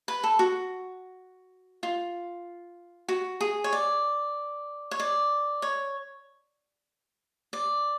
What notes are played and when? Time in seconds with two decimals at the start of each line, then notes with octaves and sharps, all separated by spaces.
0.08 B4
0.24 A4
0.39 F#4
1.83 F4
3.08 F#4
3.41 G#4
3.64 C#5
3.73 D5
4.91 C#5
5.00 D5
5.62 C#5
7.53 D5